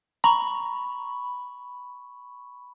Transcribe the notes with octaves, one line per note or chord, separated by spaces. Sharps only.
A#5 B5 C#6